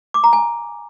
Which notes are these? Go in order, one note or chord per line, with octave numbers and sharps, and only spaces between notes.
D6
A#5
G#5